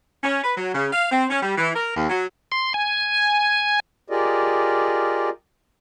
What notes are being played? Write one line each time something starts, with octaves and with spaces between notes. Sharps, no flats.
C#4
B4
F#3
C#3
F5
C4
C#4
G3
E3
A#4
D#2
F#3
C6
G#5
F4 G4 G#4 A#4 D5 D#5